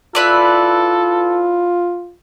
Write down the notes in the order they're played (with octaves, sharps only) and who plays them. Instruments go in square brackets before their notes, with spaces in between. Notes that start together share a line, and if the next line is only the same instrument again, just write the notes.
[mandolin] E4 B4 D5 [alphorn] F4 [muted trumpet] A4